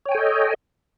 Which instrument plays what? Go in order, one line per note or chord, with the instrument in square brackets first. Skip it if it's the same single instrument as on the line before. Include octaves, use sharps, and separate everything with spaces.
[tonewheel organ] C#5
G5
G#5
A4
D#5